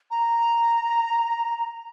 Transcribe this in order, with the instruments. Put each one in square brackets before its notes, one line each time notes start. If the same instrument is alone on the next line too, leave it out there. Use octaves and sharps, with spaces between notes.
[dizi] A#5